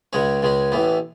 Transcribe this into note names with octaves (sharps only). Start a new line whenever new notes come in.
C#2 C#3 G#3 C#4 C#5
C#2 C#3 G#3 C#4
A1 A2 E3 B3